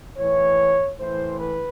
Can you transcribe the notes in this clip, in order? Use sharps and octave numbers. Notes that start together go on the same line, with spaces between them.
A2 E3 C#5
A2 E3 C5
B4